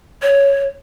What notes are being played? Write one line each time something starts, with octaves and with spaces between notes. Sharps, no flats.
C#5